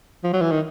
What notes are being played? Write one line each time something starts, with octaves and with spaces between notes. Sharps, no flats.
F3
F#3
E3
D#3